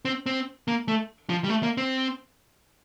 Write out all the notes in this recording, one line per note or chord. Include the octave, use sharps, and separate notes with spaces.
C4
C4
A#3
A3
F3
G3
A3
A#3
C4